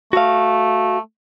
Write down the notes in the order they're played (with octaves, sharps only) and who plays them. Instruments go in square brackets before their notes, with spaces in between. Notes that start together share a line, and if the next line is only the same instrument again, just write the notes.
[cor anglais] A3 [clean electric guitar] F#4 F5